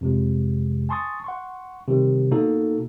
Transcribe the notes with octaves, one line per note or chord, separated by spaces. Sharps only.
F2 C3 G#3
G#5 A5 C6 C#6 D#6 A6
F#5 C6 C#6
C3 D#3 G3
B2 A#3 D#4 F#4 A4